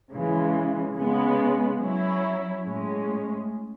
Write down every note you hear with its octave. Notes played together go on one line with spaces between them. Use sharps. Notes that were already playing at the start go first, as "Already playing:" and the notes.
C#3 E3 G#3
C#3 G#3 B3
F#3 C#4 E4
A2 G#3 C#4